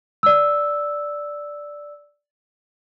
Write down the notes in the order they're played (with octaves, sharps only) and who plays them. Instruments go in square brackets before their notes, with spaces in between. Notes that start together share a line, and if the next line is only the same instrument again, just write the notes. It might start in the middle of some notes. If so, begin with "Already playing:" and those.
[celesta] D5 E6